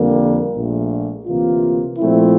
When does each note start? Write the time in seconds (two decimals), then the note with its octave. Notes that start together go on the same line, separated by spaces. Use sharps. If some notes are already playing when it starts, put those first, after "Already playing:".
Already playing: F2 D3 G3 A#3
0.55 A#1 A#2 A3
1.26 D2 C3 E3 A#3 F4
1.98 A#2 F3 A3 C4 E4